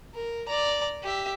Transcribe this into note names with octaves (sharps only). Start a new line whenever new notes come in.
A#4
D5 A#5
G4 E5